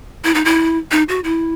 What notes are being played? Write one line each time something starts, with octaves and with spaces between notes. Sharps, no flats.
E4
D#4
E4
D#4
F#4
E4